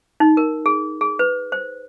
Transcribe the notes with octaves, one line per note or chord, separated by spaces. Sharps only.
D#4
A#4
G#4
G#4
B4
C5